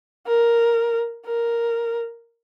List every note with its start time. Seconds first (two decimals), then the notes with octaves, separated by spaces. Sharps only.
0.27 A#4
1.26 A#4